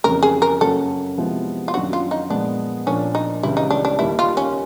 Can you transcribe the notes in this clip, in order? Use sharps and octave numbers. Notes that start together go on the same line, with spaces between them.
F2 C#3 E3 G3 A#3 A#4
G#4
A#4
F#2 C#3 F#3 A#3 A4
C3 F3 G#3 B3 E4
F4
F#2 D#3 F#3 A#3 D4 F#4
F4
D#4
A#2 F3 G#3 B3 D4
A#2 F3 A#3 C#4 D4
D#4
C#2 C#3 E3 G3 E4
D#4
D4
D4
D#2 D#3 G3 A#3 E4
F4
C#4